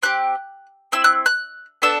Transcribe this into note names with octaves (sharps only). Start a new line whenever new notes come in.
C4 G4 F#6
C4 E4 E6
F#6
F#6
B3 D4 A4 E6